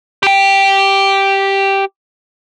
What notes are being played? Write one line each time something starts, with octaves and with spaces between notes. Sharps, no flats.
G4 G5